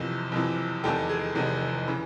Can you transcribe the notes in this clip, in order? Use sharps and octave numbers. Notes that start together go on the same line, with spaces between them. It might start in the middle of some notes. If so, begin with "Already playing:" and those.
Already playing: F#1 F2 C3 E3
F#1 F2 C3 E3
F1 E2 C3 D#3 G4 A4
G#4
F1 E2 C3 D#3
C#3 E3